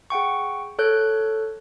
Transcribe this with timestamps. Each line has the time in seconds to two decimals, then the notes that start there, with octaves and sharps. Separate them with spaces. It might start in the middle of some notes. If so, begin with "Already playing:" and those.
0.10 G#4 F#5 G5 C#6
0.79 A4 C#5 F#6 G6